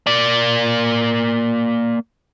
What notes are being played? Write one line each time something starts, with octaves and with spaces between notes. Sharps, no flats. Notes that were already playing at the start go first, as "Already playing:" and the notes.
A#3 D5